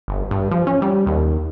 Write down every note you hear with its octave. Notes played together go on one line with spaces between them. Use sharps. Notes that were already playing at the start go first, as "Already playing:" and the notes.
G1
G2
F3
C#4
G3
D#2